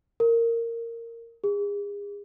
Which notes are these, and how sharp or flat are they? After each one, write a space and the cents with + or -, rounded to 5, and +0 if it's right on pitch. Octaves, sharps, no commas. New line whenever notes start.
A#4 -15
G#4 -35